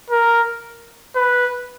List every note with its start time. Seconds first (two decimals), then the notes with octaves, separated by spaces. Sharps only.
0.10 A#4
1.16 B4